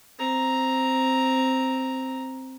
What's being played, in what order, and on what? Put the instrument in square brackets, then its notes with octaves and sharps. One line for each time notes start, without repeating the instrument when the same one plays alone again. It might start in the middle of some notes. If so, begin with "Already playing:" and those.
[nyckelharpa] C4 A#5